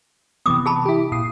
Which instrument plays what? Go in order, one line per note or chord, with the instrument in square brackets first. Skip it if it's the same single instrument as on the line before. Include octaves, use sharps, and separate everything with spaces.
[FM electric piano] C3 E3 B3 [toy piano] D6 D#6
[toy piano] G#4 A5 B5
[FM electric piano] E4 G4
A#2 D#6 C7